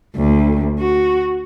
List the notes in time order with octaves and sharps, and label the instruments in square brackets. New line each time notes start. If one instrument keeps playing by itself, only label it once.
[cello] D2
F#4